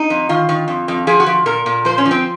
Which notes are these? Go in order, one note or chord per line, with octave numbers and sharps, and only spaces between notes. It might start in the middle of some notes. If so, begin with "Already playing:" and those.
Already playing: D#4
F2
D#3 F4
D#3
F2
F2
F3 G#4
F#4
F3
A#2 A#4
A#2
F3 C5
C#4
F3
C4